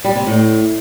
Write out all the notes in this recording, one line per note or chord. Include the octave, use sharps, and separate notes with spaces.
G3
C3
A2